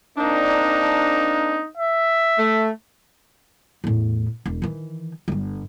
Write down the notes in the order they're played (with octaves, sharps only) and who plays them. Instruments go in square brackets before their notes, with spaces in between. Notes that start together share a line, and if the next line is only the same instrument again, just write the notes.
[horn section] A#3 C4 D4 [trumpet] D#4
[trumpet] E5
[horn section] A3
[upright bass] E2 A2
E1
D#3 E3
G1 G2